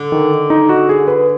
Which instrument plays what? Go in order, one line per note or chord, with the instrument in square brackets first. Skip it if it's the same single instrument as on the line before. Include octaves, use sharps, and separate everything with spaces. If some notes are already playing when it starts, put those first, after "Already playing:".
Already playing: [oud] D3
[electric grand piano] D#3
D#4
F#4
G#4
B4